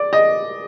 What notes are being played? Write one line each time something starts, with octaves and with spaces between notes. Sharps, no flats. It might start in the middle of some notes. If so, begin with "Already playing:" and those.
Already playing: D5
D#5